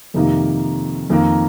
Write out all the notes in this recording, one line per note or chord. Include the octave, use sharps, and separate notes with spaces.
F2 C3 D#3 A#3 D#4
F2 D#3 A#3